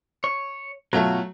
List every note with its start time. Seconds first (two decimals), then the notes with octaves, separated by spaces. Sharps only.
0.24 C#5
0.93 B2 F#3 A3 F4 F#4